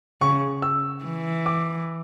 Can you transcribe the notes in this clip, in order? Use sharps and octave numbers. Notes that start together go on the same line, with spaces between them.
C#3 C#6
E6
E3
D6